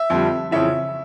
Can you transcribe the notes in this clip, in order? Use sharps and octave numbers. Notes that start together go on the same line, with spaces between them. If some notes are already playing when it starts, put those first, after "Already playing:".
Already playing: E5
F2 D3 G3
F2 C#3 E3 E5